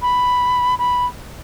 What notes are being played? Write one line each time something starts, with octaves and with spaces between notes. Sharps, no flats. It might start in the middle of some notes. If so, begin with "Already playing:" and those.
B5
B5